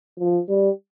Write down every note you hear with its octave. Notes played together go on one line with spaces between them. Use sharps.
F3
G3